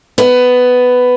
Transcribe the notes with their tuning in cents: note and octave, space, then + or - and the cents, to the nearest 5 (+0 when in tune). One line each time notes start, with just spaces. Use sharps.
B3 +10